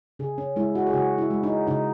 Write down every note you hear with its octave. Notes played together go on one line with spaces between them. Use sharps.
C#3 G#4
C#4
G#3 E4
F#4
G#4
C#3 F#4
E4
G#3
D#4
C#3 D#4